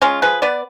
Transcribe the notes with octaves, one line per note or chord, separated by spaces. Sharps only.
G#3 C#4 F4
F3 G#4 B4
B3 B4 D5